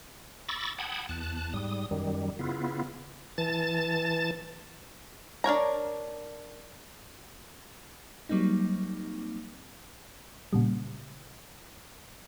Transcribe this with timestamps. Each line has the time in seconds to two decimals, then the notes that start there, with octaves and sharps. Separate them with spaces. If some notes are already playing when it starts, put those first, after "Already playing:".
0.49 B5 C#6 D6 E6 A6 A#6
0.79 F#5 G5 A5 B5 D#6 G#6
1.09 E2 A5 F#6
1.54 G#2 G3 D#6
1.91 F#2 D#3 G3
2.39 C#3 B3 E4 F4
3.38 E3 A5 A6
5.44 D4 A#4 C#5 A#5
8.29 F#3 G3 A#3 C4 D#4
10.53 A#2 C#3 G3